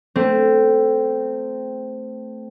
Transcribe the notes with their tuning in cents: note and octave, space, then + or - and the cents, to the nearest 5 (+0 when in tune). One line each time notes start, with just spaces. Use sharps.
A3 +0 C4 -10